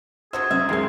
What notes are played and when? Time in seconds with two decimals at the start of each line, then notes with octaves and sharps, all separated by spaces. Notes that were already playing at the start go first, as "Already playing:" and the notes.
0.33 D3 F#4 G#4 C5 E5
0.51 F#2 E5
0.69 A1 D#3 G#3 C#4 C6 G#6